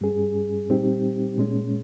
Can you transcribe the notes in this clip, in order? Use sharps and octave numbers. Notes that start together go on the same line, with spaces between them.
G2 G3 C#4 G#4
A#2 G3 C4 D#4 G4
A#2 G#3 C#4